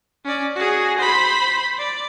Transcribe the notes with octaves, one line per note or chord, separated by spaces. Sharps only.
C#4 D5
F#4 G#4
C5 B5
D5